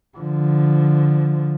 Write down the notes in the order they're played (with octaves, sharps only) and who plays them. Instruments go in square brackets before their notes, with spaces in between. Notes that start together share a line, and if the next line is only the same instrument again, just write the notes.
[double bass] D3 F3